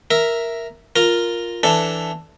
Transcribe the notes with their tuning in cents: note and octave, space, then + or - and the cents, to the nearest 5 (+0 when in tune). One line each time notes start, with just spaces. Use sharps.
A#4 +0 E5 +0
F4 +0 A#4 +0
E3 +10 D4 +0 A4 +5